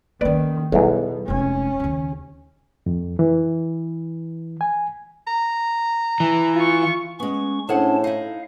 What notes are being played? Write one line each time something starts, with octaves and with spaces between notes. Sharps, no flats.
D#3 A#3 C#4 B4 D5
B1 E2 B2 G3
F1 G#3 C#4
D#2 C#3
F2
E3
G#5
A#5
E3
F4 C#6
G#3 B3 C#4 C#6
A2 C#4 D4 G#4 C5 F#5 A5
D#4 E4 F5